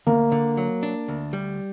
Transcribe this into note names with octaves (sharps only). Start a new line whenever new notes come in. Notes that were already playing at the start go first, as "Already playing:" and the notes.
D2 A#3
D3
F#3
D4
D2
G3